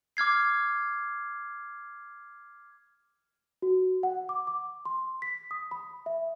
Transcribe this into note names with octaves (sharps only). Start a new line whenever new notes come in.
D6 F6 G#6 C7
F#4
F#5
D6
D6
C6
B6
D#6
B5
E5